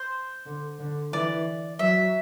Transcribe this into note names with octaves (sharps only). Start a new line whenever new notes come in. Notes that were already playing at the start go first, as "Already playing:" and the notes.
Already playing: C5
D3
D3
E3 D5
F#3 E5